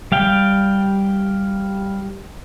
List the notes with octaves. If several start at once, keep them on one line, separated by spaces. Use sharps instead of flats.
G3 F5 G5